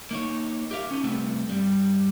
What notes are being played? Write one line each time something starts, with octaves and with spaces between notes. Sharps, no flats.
A#3 D#4 C#5
G4 A#4 E5 F5
C#4 D#4
C3 G3 A3 B3 C4
G2 G3